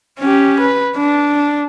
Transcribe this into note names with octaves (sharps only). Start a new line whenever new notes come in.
C#4 G4
B4
D4